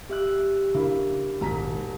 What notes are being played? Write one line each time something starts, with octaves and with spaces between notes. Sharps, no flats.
G4 E5 F#6
C#3 A#3 D4 E4
E1 A#1 G#2 D#3 A#5 B6